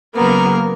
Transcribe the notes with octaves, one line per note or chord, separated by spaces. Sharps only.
C#3 F#3 A#3 B3 A#4